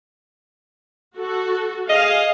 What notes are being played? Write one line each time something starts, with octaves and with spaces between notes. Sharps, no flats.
F#4 A4
G#4 D#5 F5